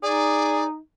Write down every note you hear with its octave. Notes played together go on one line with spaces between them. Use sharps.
D#4 G#4 D5